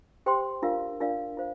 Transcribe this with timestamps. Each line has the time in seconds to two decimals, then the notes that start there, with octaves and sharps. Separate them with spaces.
0.26 G4 C5 G5 C6
0.62 D4 F4 A#4 D5 F5
1.00 D4 F4 A#4 D5 F5
1.37 F4 C5 F5